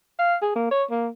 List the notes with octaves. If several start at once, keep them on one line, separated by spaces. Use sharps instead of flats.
F5
G#4
A#3
C#5
A#3